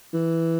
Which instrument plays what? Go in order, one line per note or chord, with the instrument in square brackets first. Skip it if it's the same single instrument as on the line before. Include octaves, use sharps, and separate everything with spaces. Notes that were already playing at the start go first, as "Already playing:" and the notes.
[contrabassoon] E3